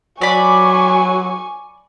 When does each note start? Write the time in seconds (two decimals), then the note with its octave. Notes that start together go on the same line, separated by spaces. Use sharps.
0.21 F#3 D5 G#5 B5 C#6